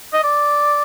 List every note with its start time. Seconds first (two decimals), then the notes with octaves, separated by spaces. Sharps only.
0.13 D#5
0.24 D5